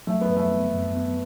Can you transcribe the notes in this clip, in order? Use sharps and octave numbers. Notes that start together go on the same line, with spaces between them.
F#3 A3
B3
F#2
A3
B3
F#2
B3